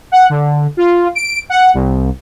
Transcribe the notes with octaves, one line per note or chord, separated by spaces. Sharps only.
F#5
D3
F4
D7
F#5
C2